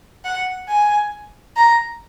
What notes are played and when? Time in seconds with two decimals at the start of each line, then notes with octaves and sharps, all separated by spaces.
0.24 F#5
0.68 G#5
1.57 A#5